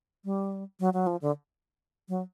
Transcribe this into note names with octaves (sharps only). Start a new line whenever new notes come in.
G3
F#3
F#3
F3
D3
F#3